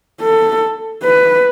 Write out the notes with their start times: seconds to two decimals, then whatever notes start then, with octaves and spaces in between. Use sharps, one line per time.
0.22 A4
1.03 B4